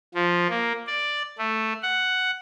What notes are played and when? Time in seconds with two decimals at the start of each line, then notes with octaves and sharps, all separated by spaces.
0.14 F3
0.50 A#3
0.87 D5
1.38 A3
1.83 F#5